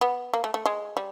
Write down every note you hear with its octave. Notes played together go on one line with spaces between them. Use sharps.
B3
A#3
A3
A3
G#3
G3